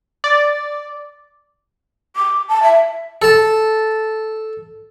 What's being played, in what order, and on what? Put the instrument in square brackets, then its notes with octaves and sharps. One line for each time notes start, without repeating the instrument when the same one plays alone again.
[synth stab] D5
[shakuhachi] D6
A5
E5
[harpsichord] A4 A5